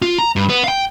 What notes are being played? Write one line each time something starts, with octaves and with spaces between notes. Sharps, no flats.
F4
A#5
G2
B3
F5 G5